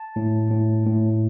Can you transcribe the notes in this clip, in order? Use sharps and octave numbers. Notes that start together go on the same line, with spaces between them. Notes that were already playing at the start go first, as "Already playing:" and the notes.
Already playing: A5
A2
A2
A2